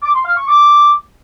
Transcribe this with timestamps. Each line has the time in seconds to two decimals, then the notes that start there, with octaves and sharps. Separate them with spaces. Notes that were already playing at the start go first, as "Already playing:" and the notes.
0.03 D6
0.14 C6
0.25 F5
0.37 C#6
0.48 D6